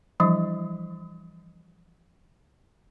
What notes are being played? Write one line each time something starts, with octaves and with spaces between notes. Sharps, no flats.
E3 F3 G3 D4 E4